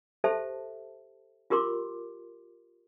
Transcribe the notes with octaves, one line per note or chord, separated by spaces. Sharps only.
G4 A4 C5 E5 A5
F4 G4 A#4 C6 D6